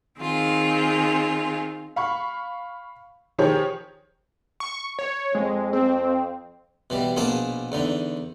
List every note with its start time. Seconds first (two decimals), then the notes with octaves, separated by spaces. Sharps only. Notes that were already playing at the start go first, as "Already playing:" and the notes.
0.20 D#3 C4 F4 G#4
1.96 F5 B5 C#6
3.38 D#3 F3 G4 G#4 C5 C#5
4.60 C#6
4.99 C#5
5.35 F2 G#3
5.73 C4
6.90 B2 E3 G3
7.16 A#1 B2 A#3 G#4 G#5 A5
7.72 E2 D3 D#4